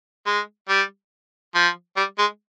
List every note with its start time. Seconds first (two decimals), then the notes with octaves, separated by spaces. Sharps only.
0.27 G#3
0.69 G3
1.55 F3
1.97 G3
2.18 G#3